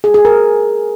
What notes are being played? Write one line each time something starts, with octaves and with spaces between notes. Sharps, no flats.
G#4
G#4
A#4